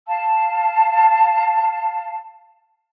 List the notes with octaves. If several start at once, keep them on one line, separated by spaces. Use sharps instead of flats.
F5 A5